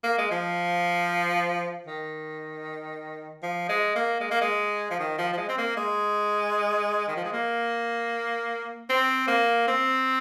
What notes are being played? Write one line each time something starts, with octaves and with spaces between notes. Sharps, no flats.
A#3
G#3
F3
D#3
F3
G#3
A#3
G#3
A#3
G#3
F3
D#3
F3
F3
G#3
C4
A#3
G#3
D#3
F3
G#3
A#3
C4
A#3
C4